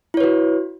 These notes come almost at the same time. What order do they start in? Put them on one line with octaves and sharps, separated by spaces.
E4 C#5 B4 F#4